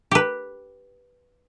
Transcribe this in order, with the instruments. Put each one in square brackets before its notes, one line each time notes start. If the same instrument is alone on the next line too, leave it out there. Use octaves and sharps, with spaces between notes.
[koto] G4 B4